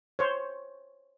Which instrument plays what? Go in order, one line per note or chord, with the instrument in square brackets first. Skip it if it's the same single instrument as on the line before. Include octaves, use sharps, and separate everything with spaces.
[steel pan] C5 C#5